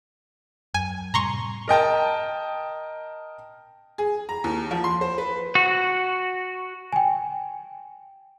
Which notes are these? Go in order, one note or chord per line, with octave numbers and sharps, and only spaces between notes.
F#2 G#5
A2 C3 G3 A#5 C6 C#6
A#4 D#5 G5 A5
G#4
A#5
D#2
F3
C6
C5
B4
F#4
G5 G#5